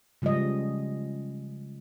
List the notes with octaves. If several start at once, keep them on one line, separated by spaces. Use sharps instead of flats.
C#3 F3 G3 G#3 D#5